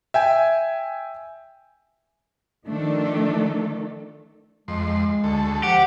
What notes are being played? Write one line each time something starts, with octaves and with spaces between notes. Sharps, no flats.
E5 G5 G#5
D#3 F3 A3 D4 A4
F2 G#3 C6
G#3
D2 A4
F3 G4 F#5